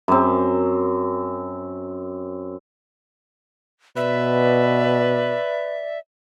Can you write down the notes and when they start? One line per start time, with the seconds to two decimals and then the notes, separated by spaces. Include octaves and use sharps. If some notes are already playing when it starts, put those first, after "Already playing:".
0.08 F#2 C4
3.97 B2 B4 D5 E5